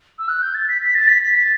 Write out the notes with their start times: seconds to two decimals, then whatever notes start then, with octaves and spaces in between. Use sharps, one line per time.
0.19 E6
0.28 F#6
0.42 G6
0.54 A6
0.69 B6
0.82 B6
0.95 A6
1.08 B6
1.23 B6
1.35 A6